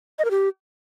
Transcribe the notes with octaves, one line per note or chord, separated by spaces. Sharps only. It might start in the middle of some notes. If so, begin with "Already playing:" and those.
D#5
A#4
G4